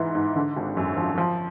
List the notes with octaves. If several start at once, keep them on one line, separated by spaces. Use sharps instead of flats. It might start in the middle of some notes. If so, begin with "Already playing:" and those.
Already playing: G#2 E3
G#2
D3
G#1
F#2
F3
F3